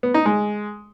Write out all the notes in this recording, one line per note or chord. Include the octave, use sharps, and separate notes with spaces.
B3
D#4
G#3